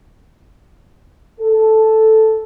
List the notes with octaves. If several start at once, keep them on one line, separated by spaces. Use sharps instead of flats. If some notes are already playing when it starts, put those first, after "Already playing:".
A4